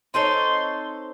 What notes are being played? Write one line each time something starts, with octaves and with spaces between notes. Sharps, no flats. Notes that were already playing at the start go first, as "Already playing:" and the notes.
C4 D#4 A4 C#5 C6